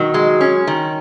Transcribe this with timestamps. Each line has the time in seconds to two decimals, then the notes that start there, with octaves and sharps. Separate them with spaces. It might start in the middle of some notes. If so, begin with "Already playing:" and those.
Already playing: B2 D#3 F#3
0.14 G#3
0.41 C#4
0.67 D#3